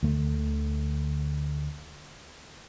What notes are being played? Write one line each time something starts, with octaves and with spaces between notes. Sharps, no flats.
D2 D3 A3